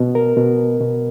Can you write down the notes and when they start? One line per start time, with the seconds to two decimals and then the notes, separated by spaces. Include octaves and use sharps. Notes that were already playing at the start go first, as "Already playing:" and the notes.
Already playing: B2
0.15 A#4
0.37 B2
0.80 B2